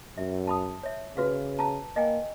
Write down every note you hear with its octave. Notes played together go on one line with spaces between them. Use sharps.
F#2 E5
A5 B5 D#6
C#5 E5
C#3 F#4 B4 F5
A5 A#5
A#3 D#5 G5 G#5